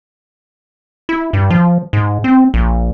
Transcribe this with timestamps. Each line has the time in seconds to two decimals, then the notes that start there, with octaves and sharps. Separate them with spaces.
1.09 E4
1.33 G2
1.50 F3
1.93 G#2
2.24 C4
2.54 A#1